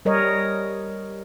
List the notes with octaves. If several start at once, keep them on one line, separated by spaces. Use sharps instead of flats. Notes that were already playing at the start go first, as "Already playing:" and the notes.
G3 A#4 C#5 D#5